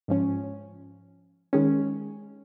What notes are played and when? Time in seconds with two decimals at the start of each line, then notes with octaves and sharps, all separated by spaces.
0.08 G#2 F3 C#4
1.53 D#3 G#3 C#4